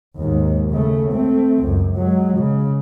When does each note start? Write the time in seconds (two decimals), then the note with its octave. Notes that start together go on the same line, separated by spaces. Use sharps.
0.16 D#2 G#2
0.71 C#3 A3
1.12 A3 C4
1.62 C#2 F#2
1.96 F#3 G#3
2.38 C#3